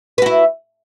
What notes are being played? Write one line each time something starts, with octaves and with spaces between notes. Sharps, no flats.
E4 F#4 B4